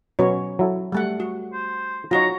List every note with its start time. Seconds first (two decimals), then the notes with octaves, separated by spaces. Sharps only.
0.19 B2 F#3 B3 C#4 C#5
0.59 F#3 E4 A4
0.92 G3 A3 F#5
1.20 F#4
1.53 C5
2.11 F#3 D#4 F4 F#4 C#5 A#5